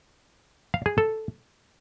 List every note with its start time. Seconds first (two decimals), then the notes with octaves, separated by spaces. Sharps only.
0.74 F5
0.86 G#4
0.98 A4